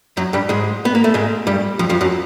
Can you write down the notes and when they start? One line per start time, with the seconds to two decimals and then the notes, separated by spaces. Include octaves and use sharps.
0.17 F#2 F#3
0.33 G2 G3
0.49 G#2 G#3
0.85 B3
0.95 A#3
1.04 A3
1.14 G#2 G#3
1.47 G2 G3
1.79 F2 F3
1.89 F2 F3
2.01 F#2 F#3